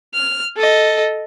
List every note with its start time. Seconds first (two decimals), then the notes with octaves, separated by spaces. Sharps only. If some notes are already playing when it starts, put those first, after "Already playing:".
0.14 F6
0.57 A4 D#5